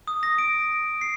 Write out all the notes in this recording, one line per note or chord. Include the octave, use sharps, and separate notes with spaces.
D#6
A#6
D7
C7